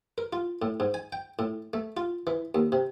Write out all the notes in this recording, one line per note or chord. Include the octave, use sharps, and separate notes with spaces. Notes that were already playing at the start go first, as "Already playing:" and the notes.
A#4
F4
A2
G#2
G#5
G5
A2
A3
F4
E3
D#2
C3